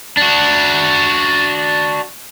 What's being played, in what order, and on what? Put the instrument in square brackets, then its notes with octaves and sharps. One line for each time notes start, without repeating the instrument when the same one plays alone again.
[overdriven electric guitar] D4 F#4